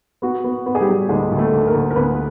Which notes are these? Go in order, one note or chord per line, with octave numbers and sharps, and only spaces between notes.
B3 F#4
B3
B3
G#4
G3 G4
F#3
D2 G#3 G#4
D2
A3 A4
D2
A#3 A#4
D2
A#4
D2 B3 B4